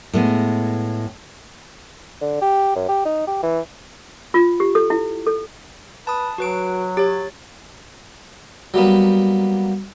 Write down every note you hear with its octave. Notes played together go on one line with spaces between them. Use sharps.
A2 G#3 B3
D3
G4
F#2
G4
D#4
G4
E3
F4
G4
A4
E4
A4
B4 A5 D#6
F#3 F#4 B4 D7
G4 C#5 A6
F#3 G3 A#3 B3